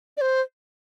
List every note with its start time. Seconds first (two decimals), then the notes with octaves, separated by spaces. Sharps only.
0.17 D5
0.21 C5